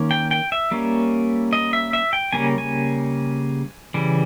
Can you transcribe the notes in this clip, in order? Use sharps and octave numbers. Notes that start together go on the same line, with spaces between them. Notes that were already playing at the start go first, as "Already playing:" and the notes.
Already playing: D#3 A#3 C#4
G5
G5
E5
G3 A#3 C#4
D#5
E5
E5
G5
C#3 G3 A#3 C#4 G#5
G#5
C#3 E3 G3